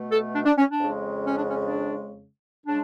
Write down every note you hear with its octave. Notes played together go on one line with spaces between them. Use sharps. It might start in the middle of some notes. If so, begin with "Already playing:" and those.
Already playing: B2 A3
A4
D4
D4
C#4
D4
F2 C#3 G#3
C#4
D4
C#4
D4
C#3 G#3 D4